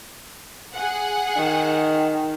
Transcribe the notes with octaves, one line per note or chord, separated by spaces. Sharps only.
G#4 F#5
D#3